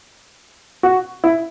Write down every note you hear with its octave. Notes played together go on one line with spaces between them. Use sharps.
F#4
E4